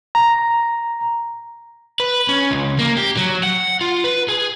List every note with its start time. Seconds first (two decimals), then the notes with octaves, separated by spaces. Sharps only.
0.15 A#5
2.00 B4
2.29 C#4
2.51 C#2
2.78 A#3
2.97 G4
3.17 F#3
3.43 F#5
3.81 F4
4.04 B4
4.28 G#4